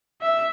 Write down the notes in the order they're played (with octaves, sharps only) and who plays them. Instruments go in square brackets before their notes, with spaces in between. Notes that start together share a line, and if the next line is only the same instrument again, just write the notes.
[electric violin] E5